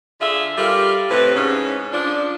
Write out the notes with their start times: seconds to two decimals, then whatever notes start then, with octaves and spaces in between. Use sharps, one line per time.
0.21 D3 F4 G#4 E5
0.58 G3 F4 G4 A4 A#4
1.10 A2 C3 C4 B4
1.35 G#2 C#4
1.92 F3 D4